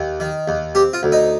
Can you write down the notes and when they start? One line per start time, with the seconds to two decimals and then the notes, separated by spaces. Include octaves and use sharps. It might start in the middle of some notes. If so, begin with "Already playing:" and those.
Already playing: D#2
0.20 D#3
0.48 D#2
0.75 C4 G4
0.93 F4
1.03 D2
1.12 D#4